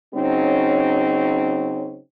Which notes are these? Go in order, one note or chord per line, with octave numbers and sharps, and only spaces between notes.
C#3 F#3 C4 C#4 D#4